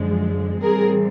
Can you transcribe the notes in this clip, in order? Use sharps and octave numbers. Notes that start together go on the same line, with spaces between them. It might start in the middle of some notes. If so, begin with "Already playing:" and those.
Already playing: F#2 D3 F3 G#3
A2 E3 G3 C4 G#4 A#4